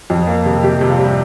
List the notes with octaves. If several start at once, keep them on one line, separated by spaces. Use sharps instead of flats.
F2
A#3
C3
C3 G4
C3
F4
G3